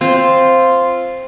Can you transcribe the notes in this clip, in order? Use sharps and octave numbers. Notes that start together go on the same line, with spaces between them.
C4 F4 C5